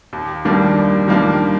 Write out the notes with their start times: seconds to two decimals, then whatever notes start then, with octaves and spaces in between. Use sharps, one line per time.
0.13 D#2
0.45 D#3 G3 A#3 D4
0.77 D#2
1.08 D#3 G3 A#3 D4